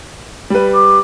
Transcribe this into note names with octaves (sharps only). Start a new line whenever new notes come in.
G3 B4
D6